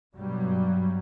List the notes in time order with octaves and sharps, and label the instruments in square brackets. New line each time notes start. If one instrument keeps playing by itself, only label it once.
[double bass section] G2 B2 F#3 G3